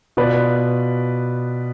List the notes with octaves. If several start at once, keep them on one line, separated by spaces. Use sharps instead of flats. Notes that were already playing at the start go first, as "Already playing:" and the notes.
B2 B3 F4 B4 D5